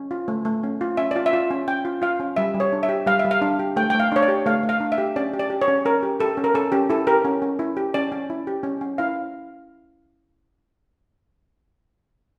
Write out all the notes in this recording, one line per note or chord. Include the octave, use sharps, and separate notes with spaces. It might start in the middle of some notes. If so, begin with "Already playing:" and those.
Already playing: C#4
F4
A3
A3
C#4
F4
C#4 E5
F4 D5
E5
F4
C#4
C#4 G5
F4
F4 F5
C#4
G3 E5
G3
C#5
D4
E5
G4
G3 F5
E5
G3
F5
D4
G4
A3 G5
A3 G5
F5
D4 C#5
D5
G4
A3 F5
A3
F5
D4
E5
G4
C#4 D5
G4
D5
G4
C#5
C#4
C#4 A#4
G4
G4 A4
C#4
A#4
C#4 A4
C#4 G4
E4 A4
G4 A#4
C#4
C#4
E4
G4
C#4 D5
C#4
E4
G4
C#4
C#4
E4 F5